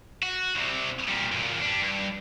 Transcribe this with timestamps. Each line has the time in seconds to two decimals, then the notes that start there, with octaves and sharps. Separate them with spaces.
0.23 F#4
0.55 C2 C3
1.08 A#2 G3
1.32 E2 A#2
1.62 G3 D4
1.82 G2